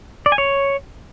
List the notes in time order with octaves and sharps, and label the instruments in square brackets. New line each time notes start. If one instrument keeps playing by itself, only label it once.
[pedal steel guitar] D5
G#5
C#5